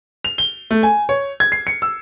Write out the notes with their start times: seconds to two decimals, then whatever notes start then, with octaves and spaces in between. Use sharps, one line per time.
0.25 F7
0.38 G7
0.71 A3
0.83 G#5
1.09 C#5
1.40 G#6
1.52 C7
1.67 C#7
1.82 E6